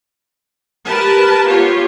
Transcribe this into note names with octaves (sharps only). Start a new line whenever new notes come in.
G4 A#4 B4 A5
B3 F4 G4 C#5